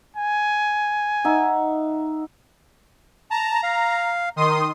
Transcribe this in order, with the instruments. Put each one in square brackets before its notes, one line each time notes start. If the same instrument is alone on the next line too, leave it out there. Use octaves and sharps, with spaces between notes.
[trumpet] G#5
[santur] D#4 E5 F#5
[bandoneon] A5 [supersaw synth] A#5
[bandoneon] F5
[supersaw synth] D#3 C6 D#6